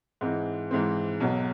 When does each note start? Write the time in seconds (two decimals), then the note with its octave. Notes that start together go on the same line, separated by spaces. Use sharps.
0.21 G#2 E3 G#3 C4
0.71 G#2 E3 G#3 C4
1.20 B1 B2 F#3